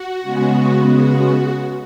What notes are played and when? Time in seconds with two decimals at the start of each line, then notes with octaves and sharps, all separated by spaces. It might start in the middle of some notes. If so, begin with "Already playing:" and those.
Already playing: F#4
0.21 C#3 G#3 B3
0.88 F#4